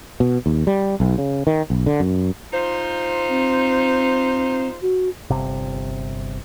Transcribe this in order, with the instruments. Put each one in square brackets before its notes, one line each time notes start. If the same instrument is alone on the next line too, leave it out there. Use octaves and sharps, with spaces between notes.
[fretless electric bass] B2
D#2
G3
B1
C#3
D#3
B1
D3
F#2
[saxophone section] D#4 F4 C5
[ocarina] C4
F#4
[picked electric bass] G1 C3